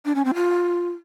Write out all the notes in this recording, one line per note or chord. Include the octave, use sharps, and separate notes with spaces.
D4
C#4
C4
F4